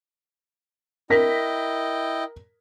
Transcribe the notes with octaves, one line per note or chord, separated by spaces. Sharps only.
E4 A#4 D#5 G5 A#6 B6